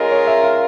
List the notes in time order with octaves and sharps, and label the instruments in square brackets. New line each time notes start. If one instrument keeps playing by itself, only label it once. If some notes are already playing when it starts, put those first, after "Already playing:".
Already playing: [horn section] G#3 C#4 F4 A#4 [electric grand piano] D#5
[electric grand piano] C#5
E5
F5